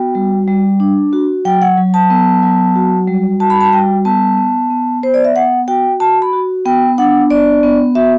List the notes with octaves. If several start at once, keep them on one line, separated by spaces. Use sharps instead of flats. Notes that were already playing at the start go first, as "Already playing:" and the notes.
Already playing: B3 F#4 G5
G3
G3
D4
F#4
F#3 G5
F#5
F#3
A5
B3
F#3
F#4
G3
F#4 A5
B5
A5
G3 G5
B3 A5
B3
B3
B3 C5
D5
E5
B3 F#5
F#4 G5
F#4 A5
B5
F#4
B3 G5
D4 F#5
B3 D5
B3
F#4 E5